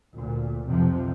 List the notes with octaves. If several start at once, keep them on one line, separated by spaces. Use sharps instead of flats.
D2 A#2
B1 F2 C3 F3